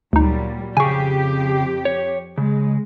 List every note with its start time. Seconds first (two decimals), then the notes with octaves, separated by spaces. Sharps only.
0.13 D2 A#2 F#3 G3 D#4
0.77 F2 C#3 G4 G#4 G#5 C#6
1.85 C#5
2.38 C#3 G#3